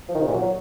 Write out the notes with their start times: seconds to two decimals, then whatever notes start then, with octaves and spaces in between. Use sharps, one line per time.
0.09 F3
0.15 D#3
0.21 C3
0.27 A#2
0.33 F#3